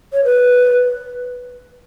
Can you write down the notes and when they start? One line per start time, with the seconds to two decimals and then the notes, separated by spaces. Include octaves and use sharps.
0.13 C#5
0.25 B4